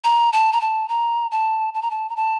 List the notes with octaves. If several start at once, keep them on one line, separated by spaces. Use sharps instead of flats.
A#5
A5
A#5
A5
A#5
A5
A5
A#5
A5
A#5
A5